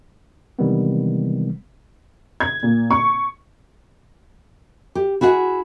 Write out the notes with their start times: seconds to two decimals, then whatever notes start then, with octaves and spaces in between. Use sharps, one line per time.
0.59 C3 D#3 E3 G3 G#3 B3
2.40 G#6
2.63 A#2
2.91 C#6
4.95 G4
5.21 E4 F#4 G#4 F#5